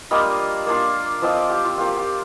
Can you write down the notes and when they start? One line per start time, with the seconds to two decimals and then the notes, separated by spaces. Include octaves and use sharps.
0.11 G3 A#3 D4 F4 D#5
0.67 A#3 D4 F4
1.22 F3 C4 F4 D#5
1.37 D5
1.50 G4
1.64 F4
1.78 A#3 F4 G4
1.96 G4